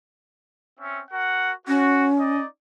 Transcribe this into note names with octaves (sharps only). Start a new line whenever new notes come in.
C4 C#4 E5
F#4 A#4 F#5
C#4 F#4
D#4 D5 D#5